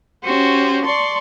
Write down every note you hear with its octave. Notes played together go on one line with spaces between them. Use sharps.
C#4 F#4 G4 C5
D5 A5 C6 C#6